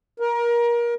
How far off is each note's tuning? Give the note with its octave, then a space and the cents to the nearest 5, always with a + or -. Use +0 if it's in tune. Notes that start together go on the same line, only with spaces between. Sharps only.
A#4 +25